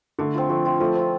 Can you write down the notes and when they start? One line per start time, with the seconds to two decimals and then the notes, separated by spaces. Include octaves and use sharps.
0.19 D3 A3
0.34 C4 F4
0.49 F3 A3
0.65 C4 F4
0.80 F3 A3
0.95 C4 F4